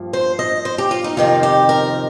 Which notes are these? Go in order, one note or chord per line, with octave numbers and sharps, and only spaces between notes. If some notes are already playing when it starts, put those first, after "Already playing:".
Already playing: G2 F3 A#3
C5
D#5
C5
G4
F4
D#4
F2 C3 D#3 F4
G4
A#4